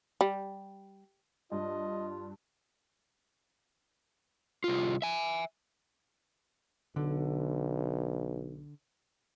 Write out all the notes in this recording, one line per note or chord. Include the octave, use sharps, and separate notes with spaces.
G3
G2 F4 D#5
C2 F4
E5 G#5
B1 D3